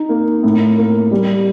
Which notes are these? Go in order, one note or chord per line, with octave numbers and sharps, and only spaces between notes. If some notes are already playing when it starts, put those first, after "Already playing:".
Already playing: D#4
A#3
A2
A#3
G3